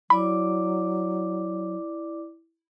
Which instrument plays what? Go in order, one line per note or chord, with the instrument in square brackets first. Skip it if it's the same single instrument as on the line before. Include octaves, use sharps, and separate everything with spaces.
[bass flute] F#3 [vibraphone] E4 D5 D6 [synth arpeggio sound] B5